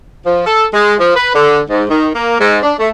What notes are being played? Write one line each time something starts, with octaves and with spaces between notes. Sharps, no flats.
F3
A4
G#3
F3
B4
D3
G#2
D#3
A#3
G#2
D4
A3